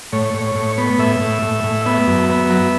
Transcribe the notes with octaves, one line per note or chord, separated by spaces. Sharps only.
A2 C#5
A2
C#5
A2
B3
A2 E5
A2
A2
A2
B3 E5
F#2
B3
F#3